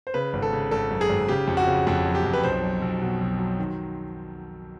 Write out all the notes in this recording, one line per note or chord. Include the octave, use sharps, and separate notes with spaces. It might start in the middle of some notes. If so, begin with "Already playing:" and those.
C5
C#3 B4
G#1
A4
C#3
G#1 A4
F#2
G#4
G#1
C#3 G4
F2
F#4
C#3
F2 F#4
F#3
G4
F2
B4
B1 C5
F#3
B1
B2
B1
F#3
D#3